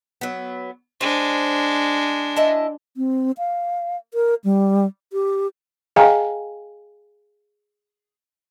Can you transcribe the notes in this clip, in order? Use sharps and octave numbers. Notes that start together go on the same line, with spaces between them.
F#3 B3
G#3 D4 C5
E4 D#5 A5
C4
F5
A#4
G3
G4
G#4 D#5 F5 G5 G#5 A#5